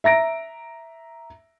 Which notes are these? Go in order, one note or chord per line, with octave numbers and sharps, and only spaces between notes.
E5 A#5 A#6 D7